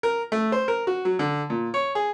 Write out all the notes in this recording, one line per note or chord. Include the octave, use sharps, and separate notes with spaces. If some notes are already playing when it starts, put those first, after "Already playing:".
A#4
A3
C5
A#4
F#4
F#3
D3
A#2
C#5
G#4